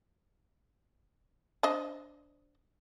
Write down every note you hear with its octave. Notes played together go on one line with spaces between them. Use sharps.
D4 C5 D#5